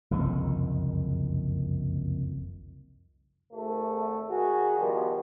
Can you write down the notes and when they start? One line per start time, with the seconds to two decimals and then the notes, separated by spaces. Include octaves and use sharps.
0.11 F#1 C2 F2 D#3
3.52 G#1 A3
4.30 D#3 F#4 G#4
4.78 B2 D#3 F3 G3